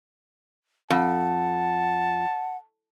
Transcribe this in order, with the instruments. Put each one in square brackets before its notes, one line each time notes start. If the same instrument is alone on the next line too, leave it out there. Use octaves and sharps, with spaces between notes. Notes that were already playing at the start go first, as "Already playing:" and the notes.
[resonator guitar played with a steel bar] F2 [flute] F#5 [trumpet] A5